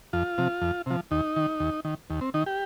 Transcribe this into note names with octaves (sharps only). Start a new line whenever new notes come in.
F2 F4
C3 F3
F2
C3 F3
D#2 D#4
D#3
D#2
D#3
D#2
C4
D#3 D#4
G4